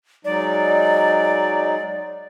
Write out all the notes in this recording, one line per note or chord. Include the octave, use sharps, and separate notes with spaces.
F#3 G#3 D#4 D5